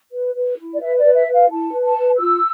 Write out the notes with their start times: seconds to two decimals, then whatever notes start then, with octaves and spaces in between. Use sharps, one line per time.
0.12 B4
0.35 B4
0.57 E4
0.74 D5
0.80 B4 E5
0.98 D5
1.04 B4
1.15 E5
1.27 B4
1.33 F5
1.50 E4 A5
1.73 B4
1.85 A5
1.96 B4
2.19 F4 E6